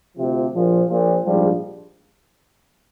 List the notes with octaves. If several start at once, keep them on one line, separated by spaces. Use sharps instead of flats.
D2 C3 F3
A#1 A#2 F3
A#1 A#2 F3
A#1 G#2 F3 G3